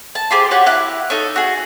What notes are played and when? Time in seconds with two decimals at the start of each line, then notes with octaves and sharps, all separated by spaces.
0.15 A5
0.31 F4 G4 G#4 C5
0.51 F#4 G4 C#5 F#5
0.66 E4 F5 F#6
1.10 D#4 A4 C#5
1.36 F#4 G#4